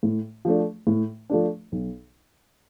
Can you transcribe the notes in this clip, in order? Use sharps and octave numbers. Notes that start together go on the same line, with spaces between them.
A2
F3 A3 D4
A2
F3 A3 D4
B1